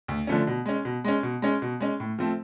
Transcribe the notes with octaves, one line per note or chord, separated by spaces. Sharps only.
D2
D3 F3 A3 C#4
B2
G#3 C#4
B2
G#3 C#4
B2
G#3 C#4
B2
G#3 C#4
A2
F3 A3 C4